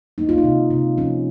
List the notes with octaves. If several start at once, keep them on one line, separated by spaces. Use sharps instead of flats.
A#3 D#4
F4
D#4
C3
C3
F3 C#4